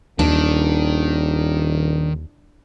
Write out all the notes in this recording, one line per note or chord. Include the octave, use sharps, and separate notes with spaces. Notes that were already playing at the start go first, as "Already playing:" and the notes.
D#1 D#2 D#3 D4